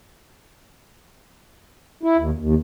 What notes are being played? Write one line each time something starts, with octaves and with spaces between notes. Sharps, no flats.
E4
D#2
D#2